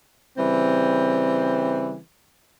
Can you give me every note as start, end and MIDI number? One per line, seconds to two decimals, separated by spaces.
0.38 1.97 49
0.38 1.97 52
0.38 1.97 55
0.38 1.97 60